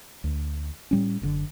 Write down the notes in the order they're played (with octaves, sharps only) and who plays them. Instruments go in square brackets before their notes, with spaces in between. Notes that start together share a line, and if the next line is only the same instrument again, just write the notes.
[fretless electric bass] D2
A2 G3 C#4
F#1 A#2 D3